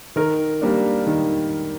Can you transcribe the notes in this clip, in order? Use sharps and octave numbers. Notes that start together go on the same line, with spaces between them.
D#3 A#4
G3 A#3 D4
D#3